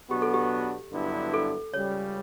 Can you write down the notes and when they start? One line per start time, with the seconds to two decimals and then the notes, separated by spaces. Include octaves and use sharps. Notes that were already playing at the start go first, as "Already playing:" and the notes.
0.10 B2 F#3 B3 D4 F#4 G4
0.22 A4
0.34 G4
0.92 G2 D3 F#3 B3 E4
1.34 A4
1.74 C#2 C#3 G3 C#5